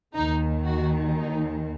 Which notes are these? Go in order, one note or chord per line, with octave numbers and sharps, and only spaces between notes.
D#2 D#3 D#4
F#4
D#4